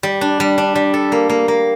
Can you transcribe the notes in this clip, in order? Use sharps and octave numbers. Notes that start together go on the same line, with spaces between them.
G3
D4
G3
D4
G3
A4
A#3
A#3
A#3